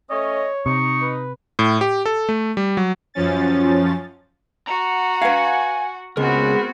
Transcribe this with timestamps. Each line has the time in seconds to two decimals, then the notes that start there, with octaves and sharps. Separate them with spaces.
0.11 A3 C#4 C#5 D#5
0.66 C3 D#4 C#6
1.02 B4
1.59 A2
1.81 G4
2.06 A4
2.29 A3
2.57 G3
2.77 F#3
3.14 F#2 F3 C#4 A6
4.67 F#4 F#5 A#5
5.22 B4 F5 G#5
6.17 C#2 G#3 B3 C4 F#4 A#4